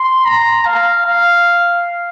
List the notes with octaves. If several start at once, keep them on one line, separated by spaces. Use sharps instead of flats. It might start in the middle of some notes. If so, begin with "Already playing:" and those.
Already playing: C6
A#5
F5
F5